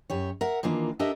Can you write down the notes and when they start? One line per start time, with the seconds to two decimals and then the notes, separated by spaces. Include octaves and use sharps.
0.10 F#2 G4 C#5
0.41 A#4 E5 F#5
0.63 D#3 E3 A#3 D4 F4
0.99 D4 G4 A4 A#4 D#5 E5